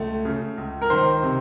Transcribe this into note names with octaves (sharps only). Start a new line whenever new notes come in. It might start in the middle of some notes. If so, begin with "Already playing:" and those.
Already playing: C#2 A3
C#3
C#2
A#4
D#3 C5
C3